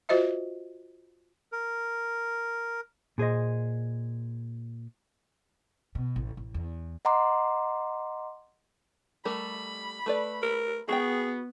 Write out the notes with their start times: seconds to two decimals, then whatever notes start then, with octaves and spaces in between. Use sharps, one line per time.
0.09 F4 F#4 C5 D#5 E5
1.52 A#4
3.18 A#2 G#4 C5 D#5
5.95 B2
6.16 A1
6.37 A1
6.54 E2
7.05 D#5 F#5 A#5 C6 D6
9.25 G3 A3 A#4 B5
10.06 A3 B4 D5
10.42 A#4
10.88 B3 F#4 G#4 G5